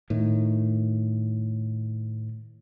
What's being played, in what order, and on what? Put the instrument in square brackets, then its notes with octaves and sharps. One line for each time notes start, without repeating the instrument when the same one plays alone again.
[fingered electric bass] A2 D#3